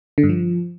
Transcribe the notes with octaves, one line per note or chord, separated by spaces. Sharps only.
D3
G2
F3